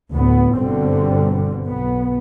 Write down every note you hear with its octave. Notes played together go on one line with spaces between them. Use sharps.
D2 A2 B3
G1 B2 D3 G3 C4
B1 B3